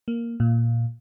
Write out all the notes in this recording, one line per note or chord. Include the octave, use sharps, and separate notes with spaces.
A#3
A#2